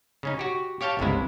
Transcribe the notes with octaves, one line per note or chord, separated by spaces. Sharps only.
C#3 C#4 D#4
F#4 G4
G4 C#5 F5 G5 A5
G1 C#2 C3 G#3 E4